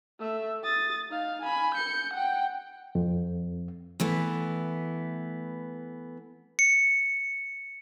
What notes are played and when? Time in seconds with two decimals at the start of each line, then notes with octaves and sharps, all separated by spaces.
0.19 A3 E5
0.63 D#6 A6
1.10 D#4 F5
1.41 G#5 B5
1.74 G6 C#7
2.13 F#5 G5
2.95 F2
4.00 E3 A3 B3
6.59 C#7